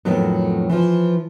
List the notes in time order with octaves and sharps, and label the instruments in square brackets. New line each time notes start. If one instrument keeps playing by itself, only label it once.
[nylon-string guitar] F2 A2 D#3 F#3 B3
E3 F3